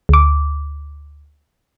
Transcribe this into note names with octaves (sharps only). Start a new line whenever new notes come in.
D2 D6